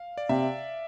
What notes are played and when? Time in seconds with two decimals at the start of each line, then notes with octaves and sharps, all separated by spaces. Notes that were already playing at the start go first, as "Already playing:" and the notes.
Already playing: F5
0.18 D5
0.29 C3 E5